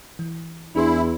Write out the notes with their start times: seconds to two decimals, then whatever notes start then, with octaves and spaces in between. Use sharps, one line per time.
0.19 E3
0.75 E2 D4 E4 G#4 C6